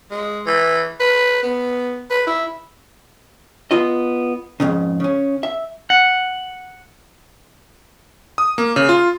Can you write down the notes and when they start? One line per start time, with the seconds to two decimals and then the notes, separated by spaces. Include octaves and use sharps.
0.11 G#3
0.46 E3
1.00 B4
1.43 B3
2.10 B4
2.27 E4
3.71 B3 F4 D#5
4.60 F2 G#2 C#3
5.00 C#3 C#4
5.43 E5
5.90 F#5
8.38 D#6
8.58 A#3
8.76 C#3
8.89 F4